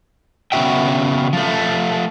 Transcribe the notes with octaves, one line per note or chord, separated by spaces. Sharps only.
C#3 B3 C#4 F#4 E5 G5
F3 A3